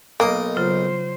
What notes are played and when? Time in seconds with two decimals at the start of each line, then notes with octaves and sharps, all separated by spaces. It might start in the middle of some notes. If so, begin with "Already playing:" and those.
0.20 B1 A#3 A#4 D#5
0.57 C#3 F#3 F4 C5